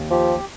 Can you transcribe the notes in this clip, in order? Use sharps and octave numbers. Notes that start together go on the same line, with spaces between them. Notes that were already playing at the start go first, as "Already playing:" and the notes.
Already playing: D#2
F3 G4